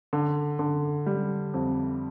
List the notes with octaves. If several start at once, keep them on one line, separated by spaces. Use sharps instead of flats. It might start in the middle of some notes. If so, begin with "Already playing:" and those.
D3
D3
G3
F2